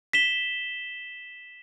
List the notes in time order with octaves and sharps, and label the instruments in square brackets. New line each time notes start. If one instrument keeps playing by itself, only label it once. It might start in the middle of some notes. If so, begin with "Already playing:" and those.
[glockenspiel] B6 E7 G7